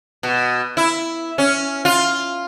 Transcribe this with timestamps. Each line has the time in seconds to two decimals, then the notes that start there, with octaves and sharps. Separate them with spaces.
0.23 B2
0.77 E4
1.38 C#4
1.85 F4